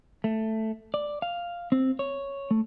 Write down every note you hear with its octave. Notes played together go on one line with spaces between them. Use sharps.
A3
D5
F5
C4
C#5
A3